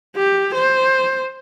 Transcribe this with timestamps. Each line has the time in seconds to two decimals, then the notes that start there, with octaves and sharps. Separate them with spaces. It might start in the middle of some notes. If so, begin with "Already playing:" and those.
0.16 G4
0.54 C5